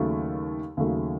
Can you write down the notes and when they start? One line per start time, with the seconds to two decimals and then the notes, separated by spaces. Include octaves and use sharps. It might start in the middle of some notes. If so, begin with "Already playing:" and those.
Already playing: D#2 C#3 F#3 A3
0.77 D#2 C#3 F#3 A3